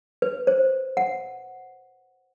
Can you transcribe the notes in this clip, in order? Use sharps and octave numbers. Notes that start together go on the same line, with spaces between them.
B4
C5
F#5